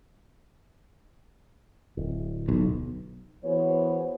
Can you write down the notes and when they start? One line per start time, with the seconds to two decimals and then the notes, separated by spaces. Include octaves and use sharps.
1.97 D1
2.49 B1
3.44 E3 B3 F#4 G#4 C5 C#5